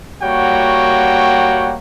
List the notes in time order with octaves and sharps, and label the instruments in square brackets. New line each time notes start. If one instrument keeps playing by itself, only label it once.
[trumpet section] G3 A#3 F#4 C#5 F#5 G5